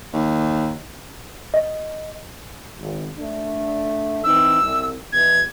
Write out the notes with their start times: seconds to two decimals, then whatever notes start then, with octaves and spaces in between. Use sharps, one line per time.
0.13 D#2
1.54 D#5
2.79 G#1
3.18 D3 A3 D4
4.24 E3 C4 D#4 E6
4.60 C2
5.12 E2 B2 G#6